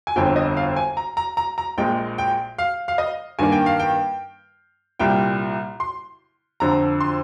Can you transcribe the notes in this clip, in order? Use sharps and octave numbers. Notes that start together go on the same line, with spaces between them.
G#5
G1 F2 D3 G5
D#5
F5
G#5
A#5
A#5
A#5
A#5
A#1 A#2 G#3 G5
G5
F5
F5
D#5
G2 D#3 A#3 G#5
G5
F5
G5
C2 A#2 G3 G5
C6
F2 D3 F3 A#5
C6